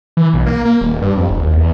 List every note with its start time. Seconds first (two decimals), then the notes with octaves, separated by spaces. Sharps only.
0.17 E3
0.33 B1
0.46 A#3
0.65 A#3
0.81 D#1
1.02 G2
1.17 F2
1.30 E1
1.42 D#2
1.57 E2